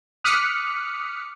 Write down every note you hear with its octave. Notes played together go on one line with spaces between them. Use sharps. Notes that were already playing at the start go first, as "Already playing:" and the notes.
D6 D#6 F6 F#6 B6 C#7